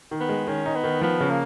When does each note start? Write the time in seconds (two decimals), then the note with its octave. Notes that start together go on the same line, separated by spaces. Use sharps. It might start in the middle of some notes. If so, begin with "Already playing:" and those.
0.11 D#3
0.20 B3
0.29 G#3
0.47 D#3 C#4
0.66 D#4
0.75 B3
0.84 D#3
1.01 F3 B3
1.20 C#3
1.29 A#3